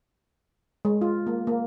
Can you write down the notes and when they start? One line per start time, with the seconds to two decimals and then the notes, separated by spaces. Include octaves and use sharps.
0.85 G#3
1.01 F4
1.27 A#3
1.47 A#3